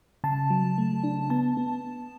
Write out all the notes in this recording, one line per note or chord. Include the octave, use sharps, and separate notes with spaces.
C#3 A5
F#3
A3
D4
B3 A5
B3